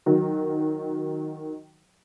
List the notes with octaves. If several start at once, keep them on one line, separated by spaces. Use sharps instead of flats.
D#3 F#3